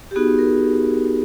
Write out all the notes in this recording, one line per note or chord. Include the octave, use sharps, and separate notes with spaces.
G4
B3 D#4 F#4 G#4
A#4